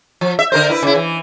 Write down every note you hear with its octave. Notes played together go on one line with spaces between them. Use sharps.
F3
E5
D3 A#4 C5
E4 B4
C#3 E4
E3